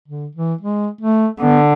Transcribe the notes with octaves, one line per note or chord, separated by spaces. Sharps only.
D3
E3
G#3
A3
D3 B3